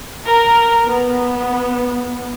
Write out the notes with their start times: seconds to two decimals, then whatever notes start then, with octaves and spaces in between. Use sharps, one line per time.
0.25 A#4
0.87 B3